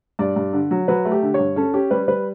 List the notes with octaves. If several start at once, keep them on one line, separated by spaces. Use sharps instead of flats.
G2 D5
G2
D3
F#3
F#3 B4
A3
G4
D3
C#5
G2
C#4 A4
C#4 G4
G3 B4
G3 B4